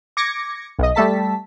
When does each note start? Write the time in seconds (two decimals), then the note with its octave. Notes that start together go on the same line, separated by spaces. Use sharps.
0.17 D6 G#6 A#6 C#7
0.79 B1 D#5
0.95 G3 A3 A4 A5 B6